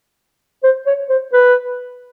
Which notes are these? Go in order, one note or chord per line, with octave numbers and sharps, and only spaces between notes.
C5
C#5
C5
B4